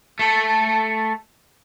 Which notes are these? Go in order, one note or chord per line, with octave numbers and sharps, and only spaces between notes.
A3 A4